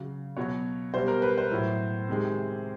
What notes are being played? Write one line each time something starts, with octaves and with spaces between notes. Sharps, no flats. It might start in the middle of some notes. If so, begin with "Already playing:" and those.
Already playing: C#3 F#3
B2 F#3 C#5
B2 G3 C5
A#4
B4
C5
A2 F#3
C3 D#3 G#3